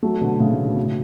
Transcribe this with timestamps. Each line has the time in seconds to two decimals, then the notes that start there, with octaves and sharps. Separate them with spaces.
0.03 F#3 A3
0.21 B2 D3
0.40 A2 C#3
0.52 A2
0.65 B2
0.77 A2